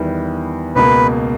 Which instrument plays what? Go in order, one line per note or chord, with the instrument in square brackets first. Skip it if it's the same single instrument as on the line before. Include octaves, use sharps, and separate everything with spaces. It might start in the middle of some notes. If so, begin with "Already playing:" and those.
Already playing: [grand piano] E2 D#3 G3 B3 E4
[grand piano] C#2 B2 A#3 [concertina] B4